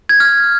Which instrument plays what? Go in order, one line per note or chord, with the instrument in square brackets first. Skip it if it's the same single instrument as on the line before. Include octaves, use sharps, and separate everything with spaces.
[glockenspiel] G#6
F6